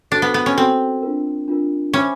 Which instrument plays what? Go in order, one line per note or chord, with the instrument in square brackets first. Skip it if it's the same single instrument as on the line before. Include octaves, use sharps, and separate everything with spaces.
[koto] D4 [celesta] F#4 A4 C5
[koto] B3
B3
C#4
[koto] C4 [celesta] F#4 A4 C5
[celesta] D4 F4 A#4
D4 F4 A#4
[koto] C#4 [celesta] C5 E5 G#5 B5 D6